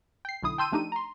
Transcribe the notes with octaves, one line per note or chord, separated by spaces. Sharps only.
G5 C7
B1 D3 E4 D#6
G5 A5 C6 E6 G6 D#7
F3 A3 D4 D#4 G4 D#7
A#5 C6